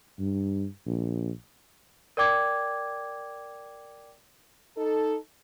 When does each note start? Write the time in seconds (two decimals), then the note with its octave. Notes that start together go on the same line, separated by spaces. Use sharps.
0.19 G2
0.86 A#1
2.17 A#4 D5 G5 D6 G#6
4.77 D#4 A4